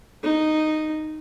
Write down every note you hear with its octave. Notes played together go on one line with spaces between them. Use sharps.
D#4